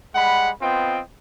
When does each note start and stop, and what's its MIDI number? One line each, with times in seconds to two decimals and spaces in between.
0.15 0.51 55
0.15 0.51 56
0.15 0.51 78
0.15 0.51 83
0.61 1.01 59
0.61 1.01 60
0.61 1.01 65
0.61 1.01 75
0.61 1.01 79